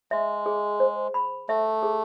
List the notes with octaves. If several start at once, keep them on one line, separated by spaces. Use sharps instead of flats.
G#3 E5
G#4
C5
B5
A3 E5
G#4